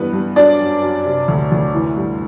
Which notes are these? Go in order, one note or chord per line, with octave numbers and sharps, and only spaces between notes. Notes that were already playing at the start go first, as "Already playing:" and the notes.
Already playing: G2 E3 B3 B4
G2
F#3 D4 D5
F#2
F#2
C3
D2
D2
E3
G2